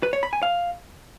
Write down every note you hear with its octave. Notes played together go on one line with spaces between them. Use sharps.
B4
C#5
B5
G#5
F5